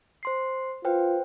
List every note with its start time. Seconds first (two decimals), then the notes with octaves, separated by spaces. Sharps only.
0.23 C5 C6 C7
0.85 F4 B4 C5 G5